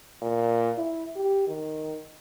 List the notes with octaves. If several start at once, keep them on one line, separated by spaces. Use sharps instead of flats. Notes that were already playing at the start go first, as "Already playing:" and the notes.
A#2
E4
G4
D#3